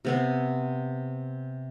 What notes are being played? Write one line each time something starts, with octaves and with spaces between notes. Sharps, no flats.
C3 B3 C4